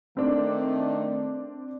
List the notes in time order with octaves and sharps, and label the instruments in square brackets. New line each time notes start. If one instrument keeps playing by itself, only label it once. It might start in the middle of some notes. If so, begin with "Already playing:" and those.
[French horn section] D#3 A3 [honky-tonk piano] C4 D4